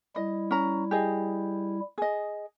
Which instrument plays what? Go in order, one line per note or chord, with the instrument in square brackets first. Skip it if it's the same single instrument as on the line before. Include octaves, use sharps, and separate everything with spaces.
[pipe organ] G3 E4 [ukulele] D#5
[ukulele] C#4 A#5
G4 G#4 D#5
G#4 D#5